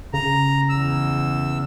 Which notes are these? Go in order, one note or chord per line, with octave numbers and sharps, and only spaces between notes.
C#3 A#5
E2 E6